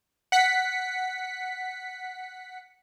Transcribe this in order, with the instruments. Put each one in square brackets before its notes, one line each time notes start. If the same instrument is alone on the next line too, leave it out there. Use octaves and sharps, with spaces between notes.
[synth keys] F#5 B6 C#7